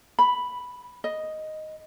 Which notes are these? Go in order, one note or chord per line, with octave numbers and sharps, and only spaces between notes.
B5
D#5